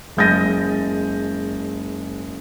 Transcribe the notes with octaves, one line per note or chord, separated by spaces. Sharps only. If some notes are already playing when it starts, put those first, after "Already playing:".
F#1 G#3 G6 A6 A#6 D#7